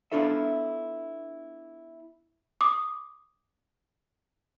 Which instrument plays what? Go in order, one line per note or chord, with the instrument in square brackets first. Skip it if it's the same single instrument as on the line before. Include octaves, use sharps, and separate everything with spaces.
[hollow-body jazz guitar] B3 D4 E4 F4 A4 E5
[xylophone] D6 D#6